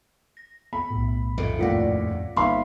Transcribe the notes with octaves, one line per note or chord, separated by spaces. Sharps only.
A#6
B3 B5
B1 A2
F2 G#2 C#3 A4 D#5 E5
D#2 A2 F4 D5 F#5 A#6 B6 C#7
G1 A#3 B3 D#4 E5 F5 B5 C6